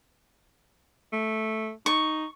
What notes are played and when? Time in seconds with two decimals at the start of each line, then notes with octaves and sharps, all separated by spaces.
1.13 A3
1.86 D#4 C#6